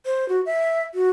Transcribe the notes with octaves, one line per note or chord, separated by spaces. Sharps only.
C5
F#4
E5
F#4